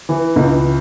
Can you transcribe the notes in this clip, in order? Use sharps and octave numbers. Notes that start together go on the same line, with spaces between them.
E3
C#2